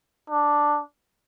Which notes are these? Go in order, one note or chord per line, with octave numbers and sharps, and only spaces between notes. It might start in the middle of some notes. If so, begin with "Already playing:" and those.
D4